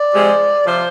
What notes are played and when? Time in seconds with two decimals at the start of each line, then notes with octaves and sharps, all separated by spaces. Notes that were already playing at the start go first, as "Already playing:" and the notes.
Already playing: D5
0.13 C3 F3 G#3
0.65 C3 F3 C5